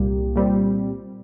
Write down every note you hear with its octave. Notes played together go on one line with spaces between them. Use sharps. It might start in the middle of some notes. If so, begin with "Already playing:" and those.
Already playing: C2 A#2 G3 A#3 G4
A#2 G3 C4